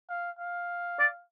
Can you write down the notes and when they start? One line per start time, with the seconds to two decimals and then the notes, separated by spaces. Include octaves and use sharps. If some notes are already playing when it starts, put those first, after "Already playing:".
0.09 F5
0.39 F5
1.00 D5